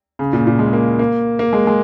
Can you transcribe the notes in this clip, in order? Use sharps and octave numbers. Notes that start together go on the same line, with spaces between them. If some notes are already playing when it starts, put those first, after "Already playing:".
C#3
A#2
A#2
G#3
A#3
A#3
A#3
G#3
G#3